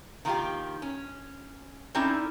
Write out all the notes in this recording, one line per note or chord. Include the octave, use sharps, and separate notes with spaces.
D#3 F3 A#3 D#4 F4 G4
C#4
C4 C#4 D#4 E4 A4 D5